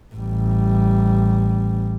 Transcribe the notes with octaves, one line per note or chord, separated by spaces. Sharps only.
A1 G3